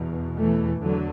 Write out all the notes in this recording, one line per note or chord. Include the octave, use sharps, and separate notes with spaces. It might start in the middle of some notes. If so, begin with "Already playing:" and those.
Already playing: E2 B2
E3 A3
E2 D3 F#3